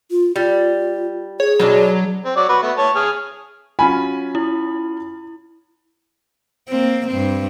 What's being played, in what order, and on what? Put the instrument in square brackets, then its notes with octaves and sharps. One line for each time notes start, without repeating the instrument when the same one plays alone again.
[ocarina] F4
[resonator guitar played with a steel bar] G3 [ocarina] F4
[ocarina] G#4 [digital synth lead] C#5
[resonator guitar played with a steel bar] B2 G#3 D4 [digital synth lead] F#3
[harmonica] C4
F#3 D5
F#4 B4
A3 B3
C#5 A5
G#4 F6
[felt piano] F#3 C#4 F4 [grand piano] G#5 [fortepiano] B5
[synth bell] E4
[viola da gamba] A#3 C4
G2 C4